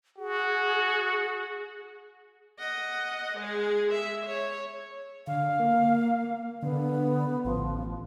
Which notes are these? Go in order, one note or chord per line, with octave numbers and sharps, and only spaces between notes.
F#4 G#4
D#5 F#5
G#3 G#4
E5
C#5
D3 F5
A#3
D3 B3
A1 F3